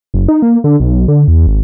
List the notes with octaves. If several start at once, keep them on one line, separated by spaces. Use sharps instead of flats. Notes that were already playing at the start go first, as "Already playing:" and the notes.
F#1
D#4
A#3
D3
B1
D3
E2
G#1